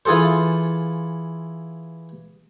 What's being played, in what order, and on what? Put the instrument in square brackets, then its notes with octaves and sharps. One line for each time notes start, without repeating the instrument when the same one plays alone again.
[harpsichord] E3 F4 G#4 A4 C5